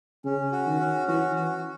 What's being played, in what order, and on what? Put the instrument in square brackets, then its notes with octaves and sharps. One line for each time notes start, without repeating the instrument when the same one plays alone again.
[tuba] C#3 [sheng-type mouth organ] C#4
[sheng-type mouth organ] F#4
[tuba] D#3
[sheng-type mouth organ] C#4
[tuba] E3 [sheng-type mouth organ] F#4
[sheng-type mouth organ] F#4